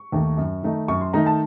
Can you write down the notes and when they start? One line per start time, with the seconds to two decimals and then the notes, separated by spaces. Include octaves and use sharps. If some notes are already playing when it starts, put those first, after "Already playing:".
Already playing: C#6
0.12 D#2 D#3 A3 D#4
0.37 F#2
0.63 D#3 A3 D#4
0.88 F#2 C#6
1.01 C6
1.13 D#3 A3 D#4 A#5
1.26 A5